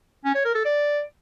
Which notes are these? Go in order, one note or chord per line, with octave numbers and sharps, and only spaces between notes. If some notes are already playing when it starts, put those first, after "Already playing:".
C#4
C#5
A#4
A4
D5